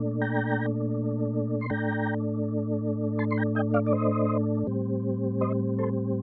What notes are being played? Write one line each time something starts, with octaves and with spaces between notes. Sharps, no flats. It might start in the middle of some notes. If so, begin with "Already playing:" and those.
Already playing: A#2 A3 D4
G5 A#5
C6
A2 A3 D4 G5 A#5
A5 C6
C6
G5 A#5
D#5 G5
D5 F5
D5
C5 D#5
A2 G3 C4
C5 D#5
A4 C5